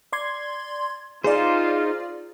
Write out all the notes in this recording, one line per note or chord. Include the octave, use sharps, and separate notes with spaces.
D5 C6 G#6
D#4 F4 G#4 C5 D5